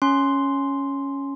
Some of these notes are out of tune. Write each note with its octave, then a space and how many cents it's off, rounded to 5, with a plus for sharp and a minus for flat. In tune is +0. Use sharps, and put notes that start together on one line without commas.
C#4 +0 C6 +0